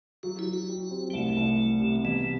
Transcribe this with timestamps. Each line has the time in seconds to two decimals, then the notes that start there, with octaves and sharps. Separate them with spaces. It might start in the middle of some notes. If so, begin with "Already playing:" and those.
0.23 F#3 F#4
0.39 E4
0.46 F#3
0.54 F#4
0.69 G4
0.91 C4
1.10 G3
1.13 C2 A3
1.36 C2
1.60 G3
1.82 C3
2.04 B2 E3